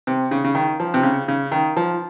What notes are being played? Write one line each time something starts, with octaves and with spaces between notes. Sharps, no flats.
C3
C#3
C#3
D#3
F3
C3
C#3
C#3
D#3
F3